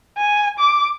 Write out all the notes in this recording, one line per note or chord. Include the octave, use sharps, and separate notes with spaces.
G#5
D6